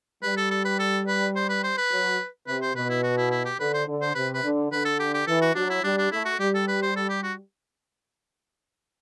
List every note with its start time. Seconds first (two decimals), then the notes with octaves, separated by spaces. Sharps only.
0.23 G3 B4
0.37 A4
0.51 A4
0.65 B4
0.80 A4
1.08 B4
1.36 C5
1.49 B4
1.64 C5
1.77 B4
1.92 F#3
2.47 C3 B4
2.62 C5
2.75 B2 B4
2.90 E4
3.03 F#4
3.17 E4
3.31 E4
3.45 G4
3.60 D3 B4
3.74 C5
3.88 D3
4.02 C5
4.15 C3 B4
4.34 B4
4.44 D3
4.72 D3 B4
4.85 A4
5.00 G4
5.14 G4
5.27 E3 A4
5.42 F#4
5.55 F#3 D4
5.70 E4
5.84 G3 D4
5.98 D4
6.12 A3 E4
6.25 F#4
6.40 G3 G4
6.54 A4
6.68 B4
6.82 C5
6.96 A4
7.09 G4
7.23 F#4